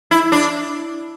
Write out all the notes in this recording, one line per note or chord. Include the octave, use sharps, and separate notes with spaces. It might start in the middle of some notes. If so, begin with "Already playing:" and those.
E4
D4